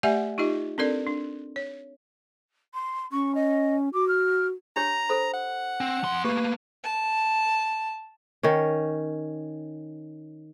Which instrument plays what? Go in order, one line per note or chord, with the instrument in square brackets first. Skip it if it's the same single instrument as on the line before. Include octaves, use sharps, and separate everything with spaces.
[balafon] A3 G4 D5 E5 F#5 G#5
D#4 F4 G4 D#5
C4 D4 A4 A#4 D5
D4
C#5
[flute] C6
[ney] C#4 [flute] C#6
[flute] D#5
[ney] F#4 [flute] D6
[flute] F6
[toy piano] D4 G4 C#5 [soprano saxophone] A#5
[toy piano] A4 C5 B5
[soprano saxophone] F#5
[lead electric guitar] C4
F2 C6
[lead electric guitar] A3 A#3 [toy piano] G4 C#6 [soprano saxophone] B4
[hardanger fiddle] A5
[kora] D#3 C#4